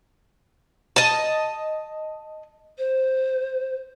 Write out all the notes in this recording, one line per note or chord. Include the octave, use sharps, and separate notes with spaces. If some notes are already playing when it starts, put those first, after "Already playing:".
D#5 A5
C5